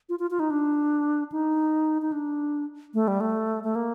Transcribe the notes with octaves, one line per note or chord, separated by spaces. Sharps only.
F4
F4
F4
D#4
D4
D#4
D#4
D4
A3
G3
A3
A3
A#3